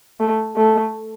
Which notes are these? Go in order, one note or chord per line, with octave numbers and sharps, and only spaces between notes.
A3
A3